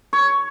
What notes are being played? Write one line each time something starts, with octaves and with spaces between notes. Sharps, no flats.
C#5